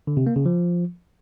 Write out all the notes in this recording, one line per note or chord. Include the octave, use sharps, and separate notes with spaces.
D3
C3
A#3
C#3
F3